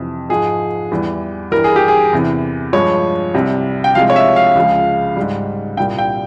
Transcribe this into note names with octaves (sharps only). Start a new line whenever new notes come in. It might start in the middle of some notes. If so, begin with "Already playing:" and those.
Already playing: F2 C3 E3
G#2 F3 G#3 G#4
E2 E3 G3
G2 E3 G3 A#4
G#4
G4
G#4
E2 C3 E3
G2 F3 G#3 C#5
C2 C3 G3
G5
C2 C3 F3 G#3 F5
C#5
E5
F5
C#2 C#3 F3 G#3
G#2 G3
C2 A#2 G3 G5
G5